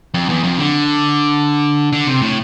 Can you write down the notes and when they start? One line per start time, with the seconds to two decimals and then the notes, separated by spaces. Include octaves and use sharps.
0.14 F2
0.29 E2
0.44 F2
0.58 D3
1.93 D3
2.07 C3
2.22 A2